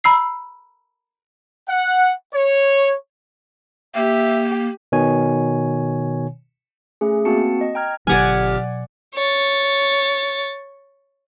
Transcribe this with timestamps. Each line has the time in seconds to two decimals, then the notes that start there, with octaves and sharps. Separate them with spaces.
0.04 A#5 B5 E6 C7
1.69 F#5
2.34 C#5
3.95 A#3 G4 E5
4.92 B2 D#3 C#5 G#5
7.01 A3 C#4 G#4
7.25 A#3 C4 F#4 A5 C#7
7.61 D#5
7.75 G5 A#5 F6 G#6
8.07 G1 B2 F#3 G4 D5 F#5 G#5 F6
9.14 C#5 A6